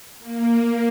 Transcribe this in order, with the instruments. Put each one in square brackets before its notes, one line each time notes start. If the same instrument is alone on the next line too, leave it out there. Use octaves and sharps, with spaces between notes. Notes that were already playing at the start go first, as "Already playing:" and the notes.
[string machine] A#3